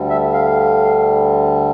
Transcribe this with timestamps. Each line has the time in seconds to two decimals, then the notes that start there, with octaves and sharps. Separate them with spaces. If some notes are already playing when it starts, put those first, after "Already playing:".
Already playing: D2 D3 G3
0.10 E5
0.33 F5